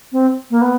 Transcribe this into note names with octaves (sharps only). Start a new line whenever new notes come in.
C4
A#3
B3